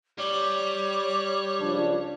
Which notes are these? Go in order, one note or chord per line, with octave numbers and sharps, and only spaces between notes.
G3 C#5 D6
C#2 F3 D4